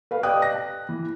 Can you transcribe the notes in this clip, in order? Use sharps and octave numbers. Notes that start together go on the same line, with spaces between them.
B4 F5
G4 D5 D#5 G5 D#6 F#6
A#6
E3